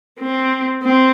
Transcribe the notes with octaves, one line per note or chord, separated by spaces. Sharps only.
C4
C4